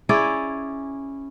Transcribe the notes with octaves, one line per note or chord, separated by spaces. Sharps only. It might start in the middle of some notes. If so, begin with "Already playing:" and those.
C#4 E4 G#4 D5